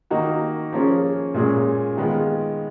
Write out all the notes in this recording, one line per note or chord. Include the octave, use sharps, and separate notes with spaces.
D#3 A#3 D#4 F#4
F3 A#3 C#4 G#4
A#2 G#3 C#4 G#4
D#3 G#3 B3 F4